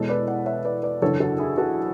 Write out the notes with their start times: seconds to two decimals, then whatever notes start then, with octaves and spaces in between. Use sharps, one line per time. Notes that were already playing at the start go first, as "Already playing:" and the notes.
Already playing: E2 B2 G#3 A4 C#5
0.09 B4 D5
0.27 D5 F#5
0.46 C#5 E5
0.64 B4 D5
0.83 B4 D5
1.02 F#1 E2 D3 A4 C#5
1.20 F#4 A4
1.38 E4 G#4
1.57 F#4 A4